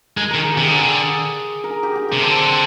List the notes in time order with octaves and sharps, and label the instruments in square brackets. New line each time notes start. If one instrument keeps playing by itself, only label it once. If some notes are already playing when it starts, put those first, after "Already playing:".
[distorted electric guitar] G#3 [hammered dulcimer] A#4
[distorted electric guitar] D#3 [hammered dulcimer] A#4
[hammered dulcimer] G#4
[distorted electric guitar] C3 [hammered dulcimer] G4
[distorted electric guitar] D3 [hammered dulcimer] G#4
[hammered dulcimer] A#4
G#4
G4
G4
[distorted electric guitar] C3 [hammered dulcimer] G4
[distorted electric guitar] D3 [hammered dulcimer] C4